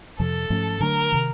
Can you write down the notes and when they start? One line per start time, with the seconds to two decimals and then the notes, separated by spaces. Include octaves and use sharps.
0.19 F2 C3 F3 A4
0.50 G#2 F3 A3 C#4
0.80 D3 F#3 A3 D4 A#4
1.12 C3 D#3